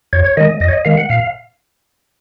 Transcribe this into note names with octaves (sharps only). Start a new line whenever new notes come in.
F2 C#5
C#5
D#3 G#3 D#5
F2 D#5
C#5
D#5
D#3 G#3 F5
F#5
A#2 F5